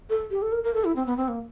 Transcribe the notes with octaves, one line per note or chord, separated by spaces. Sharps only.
A4
G4
A4
A#4
A#4
A4
E4
C4
B3
C4
A#3